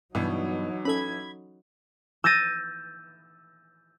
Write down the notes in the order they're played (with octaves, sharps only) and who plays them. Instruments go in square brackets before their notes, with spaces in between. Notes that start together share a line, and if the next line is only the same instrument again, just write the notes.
[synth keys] G2 B2 [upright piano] E3 [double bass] F#3 D#4
[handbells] C#4 A4 [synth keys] B5 G#6
[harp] E6 G6 A6 A#6 D#7